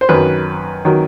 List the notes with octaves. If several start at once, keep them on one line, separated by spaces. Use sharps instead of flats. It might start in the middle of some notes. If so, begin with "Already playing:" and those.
C5
F#2 D#3 F#3 B4
D#3 F#3